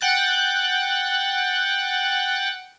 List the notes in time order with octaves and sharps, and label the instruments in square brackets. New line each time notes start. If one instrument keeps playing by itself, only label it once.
[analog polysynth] F#5 G5 F#6 A6